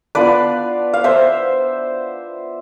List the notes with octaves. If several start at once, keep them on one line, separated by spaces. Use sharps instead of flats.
B3 D4 F4 B4 D5
F5
C5 E5